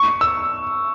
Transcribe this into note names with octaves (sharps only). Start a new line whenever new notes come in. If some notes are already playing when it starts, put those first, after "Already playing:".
Already playing: C#6
E6